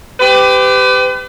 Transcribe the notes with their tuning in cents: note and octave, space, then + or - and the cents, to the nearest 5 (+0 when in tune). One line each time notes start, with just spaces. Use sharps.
G4 +0 B4 +40